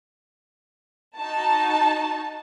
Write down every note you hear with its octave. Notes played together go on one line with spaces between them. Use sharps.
D#4 F#4 A5